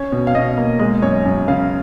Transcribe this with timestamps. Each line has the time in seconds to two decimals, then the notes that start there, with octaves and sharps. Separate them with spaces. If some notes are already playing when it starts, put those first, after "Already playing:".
Already playing: C#4 C#5
0.12 B2
0.27 F5
0.35 B2 D#5
0.57 A#3
0.79 G#3 D#5
1.02 F#2 C#5
1.25 F#2
1.48 C#3 F5